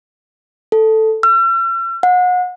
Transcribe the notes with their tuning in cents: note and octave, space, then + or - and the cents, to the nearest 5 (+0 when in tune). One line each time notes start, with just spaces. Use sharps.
A4 +0
E6 +45
F#5 -35